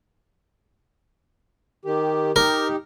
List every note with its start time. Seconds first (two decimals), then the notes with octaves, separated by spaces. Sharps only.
1.85 D#3 G4
2.36 D#4 G4 A#4